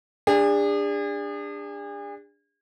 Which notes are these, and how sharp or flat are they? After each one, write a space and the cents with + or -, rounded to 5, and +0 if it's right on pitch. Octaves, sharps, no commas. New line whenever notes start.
D4 +0 G#4 -40